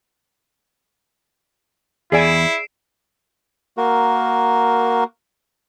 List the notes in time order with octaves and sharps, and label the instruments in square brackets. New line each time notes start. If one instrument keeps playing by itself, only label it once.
[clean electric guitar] E2 [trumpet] E4 [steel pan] G#4 D5 G#5 [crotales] C7 D7 E7
[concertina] A#3 F#4 A#4